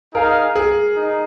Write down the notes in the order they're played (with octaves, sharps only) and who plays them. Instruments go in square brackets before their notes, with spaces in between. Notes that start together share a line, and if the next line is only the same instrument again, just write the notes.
[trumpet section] D#4 G#4 F5 [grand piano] A#4
[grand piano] G#4
[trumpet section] D#4